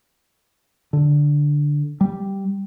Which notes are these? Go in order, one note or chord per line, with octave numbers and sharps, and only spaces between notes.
D3
G3